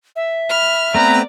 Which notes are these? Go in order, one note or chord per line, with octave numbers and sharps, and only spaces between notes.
E5
B5 F6
A3 B3 C4 B4 D5 A#5